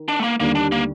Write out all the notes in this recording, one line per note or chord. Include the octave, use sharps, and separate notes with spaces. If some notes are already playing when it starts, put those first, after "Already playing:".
Already playing: D#3
D4
A3
A#3
D#2 D3 G3 A#3
D4
A#3